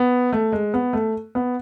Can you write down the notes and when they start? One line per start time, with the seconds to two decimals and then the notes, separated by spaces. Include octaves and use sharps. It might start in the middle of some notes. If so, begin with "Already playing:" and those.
Already playing: B3
0.33 A3
0.52 G#3
0.74 B3
0.93 A3
1.35 B3